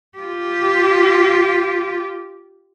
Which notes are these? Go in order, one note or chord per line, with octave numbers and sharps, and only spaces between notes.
F4 G4